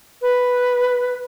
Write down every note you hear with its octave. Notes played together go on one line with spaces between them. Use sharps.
B4